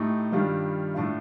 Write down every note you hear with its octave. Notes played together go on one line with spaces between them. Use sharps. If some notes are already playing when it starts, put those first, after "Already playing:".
Already playing: A2 A3 D#4 G4
G2 D#3 G3 D4 F4
A2 A3 D4 F4